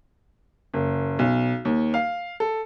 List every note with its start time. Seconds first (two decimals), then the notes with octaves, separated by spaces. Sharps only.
0.74 F#1
1.19 B1
1.65 D#2
1.94 F5
2.40 A4